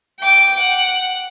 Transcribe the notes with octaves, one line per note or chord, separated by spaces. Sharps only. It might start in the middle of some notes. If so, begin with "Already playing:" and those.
G5 D6
F#5